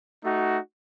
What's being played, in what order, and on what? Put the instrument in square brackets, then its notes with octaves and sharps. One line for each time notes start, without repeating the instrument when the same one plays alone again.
[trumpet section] A3 D#4 F#4